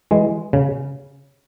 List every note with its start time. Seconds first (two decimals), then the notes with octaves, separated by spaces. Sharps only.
0.11 E3 G#3
0.53 C#3